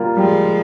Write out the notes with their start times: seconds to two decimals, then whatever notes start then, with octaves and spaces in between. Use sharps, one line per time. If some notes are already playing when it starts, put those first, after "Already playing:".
Already playing: G3 A#3 F4
0.17 F3 G3 G#3